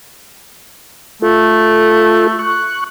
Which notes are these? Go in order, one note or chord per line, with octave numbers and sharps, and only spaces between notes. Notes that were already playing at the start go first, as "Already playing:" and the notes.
A3 F4 A4
C#6 F#6